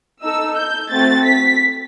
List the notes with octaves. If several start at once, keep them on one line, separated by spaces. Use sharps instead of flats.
D#4 A4 E6
G6
A3 C4 F#4 A6
B6